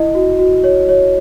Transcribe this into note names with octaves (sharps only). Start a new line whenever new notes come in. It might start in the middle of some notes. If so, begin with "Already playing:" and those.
Already playing: E4 D#5
F#4
F#4
C#5
C#5